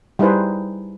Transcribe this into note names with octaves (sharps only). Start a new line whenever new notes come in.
G3 D#4 E4 G#4 B4 C5